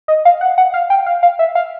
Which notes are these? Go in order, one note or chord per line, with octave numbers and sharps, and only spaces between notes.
D#5
F5
F#5
F#5
F5
G5
F5
F5
E5
F5